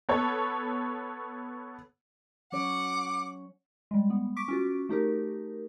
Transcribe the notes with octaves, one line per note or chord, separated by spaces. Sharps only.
B3 A4 C#5
F#3 C#4 C#5 F#5 D6
G3 G#3
B3
C#6 D6 B6 D7
C#4 F4 F#4
A3 D#4 G4 A#4